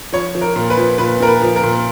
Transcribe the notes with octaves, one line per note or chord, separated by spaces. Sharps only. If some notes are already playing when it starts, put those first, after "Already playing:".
F3 C#5
F3
A#4
A#2
B4
F3
A#2 B4
A#2 A#4
B4
F3
A#4
A#2